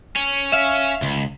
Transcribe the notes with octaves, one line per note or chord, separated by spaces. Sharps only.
C#4
E5 F5
C#2